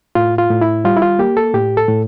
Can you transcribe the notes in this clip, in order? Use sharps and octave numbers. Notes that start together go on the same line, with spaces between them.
A2 F4
F4
A2
E4
G3 F4
E4
F4
A#3 G4
A4
A2 G4
A4
A2